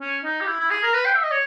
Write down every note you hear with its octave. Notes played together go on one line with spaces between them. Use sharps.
C#4
D#4
G4
E4
E4
G#4
A#4
B4
G5
E5
D#5
C#5